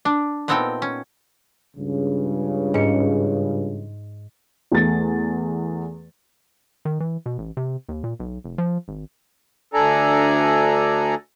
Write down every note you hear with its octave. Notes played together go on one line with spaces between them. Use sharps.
D4
A#2 B3 C4 D#4 A4 G5
C#4
C#2 G2 C#3
G#2 C#7
E2 A3 A6
D#3
E3
B2
A1
C3
D#2
A#2
B1
F1
F3
G#1
D2 D4 A4 D5 G#5 A#5